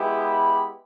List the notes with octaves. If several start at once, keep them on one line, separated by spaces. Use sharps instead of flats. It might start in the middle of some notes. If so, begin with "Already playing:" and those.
Already playing: G#3 B3 E4 G4
B5